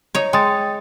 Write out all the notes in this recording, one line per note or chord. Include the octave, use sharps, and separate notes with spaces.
D#4 C#5
G#3 G5 D#6 A6